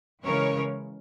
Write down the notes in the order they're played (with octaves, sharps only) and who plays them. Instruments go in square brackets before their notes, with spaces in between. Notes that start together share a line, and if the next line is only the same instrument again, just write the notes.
[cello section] C#3 E3 G#3 C#4 A#4 C#5